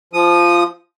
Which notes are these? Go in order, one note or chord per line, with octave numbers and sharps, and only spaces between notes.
F3 D#6